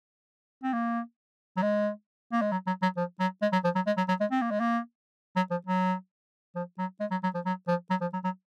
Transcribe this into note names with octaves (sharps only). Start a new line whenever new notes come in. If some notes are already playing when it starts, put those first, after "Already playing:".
C4
A#3
F#3
G#3
A#3
G#3
F#3
F#3
F#3
F3
F#3
G#3
F#3
F3
F#3
G#3
F#3
F#3
G#3
C4
A#3
G#3
A#3
F#3
F3
F#3
F3
F#3
G#3
F#3
F#3
F3
F#3
F3
F#3
F3
F#3
F#3